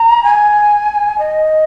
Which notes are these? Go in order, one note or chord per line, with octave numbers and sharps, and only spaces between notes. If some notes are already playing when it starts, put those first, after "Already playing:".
Already playing: A#5
G#5
D#5